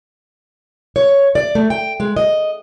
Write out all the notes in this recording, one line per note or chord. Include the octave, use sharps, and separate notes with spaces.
C#5
D5
A3
G5
G#3
D#5